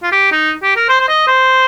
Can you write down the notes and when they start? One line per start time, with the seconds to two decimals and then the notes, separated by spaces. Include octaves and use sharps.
0.03 F4
0.12 G4
0.32 D#4
0.63 G4
0.76 A#4
0.89 C5
1.00 C5
1.08 D#5
1.27 C5